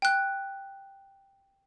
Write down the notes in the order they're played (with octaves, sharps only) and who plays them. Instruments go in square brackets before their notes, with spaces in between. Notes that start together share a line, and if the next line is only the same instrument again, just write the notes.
[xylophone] G5 F#6